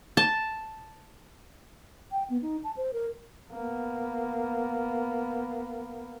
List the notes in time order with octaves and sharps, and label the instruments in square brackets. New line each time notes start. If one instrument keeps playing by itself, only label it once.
[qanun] A5
[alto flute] G5
B3
D#4
A5
C5
A#4
[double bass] A#3 B3